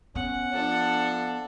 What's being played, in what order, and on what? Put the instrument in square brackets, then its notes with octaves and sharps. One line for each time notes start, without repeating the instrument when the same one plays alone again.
[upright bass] B3 [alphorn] C#4 [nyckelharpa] F#5
[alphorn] F3 [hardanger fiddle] D4 A4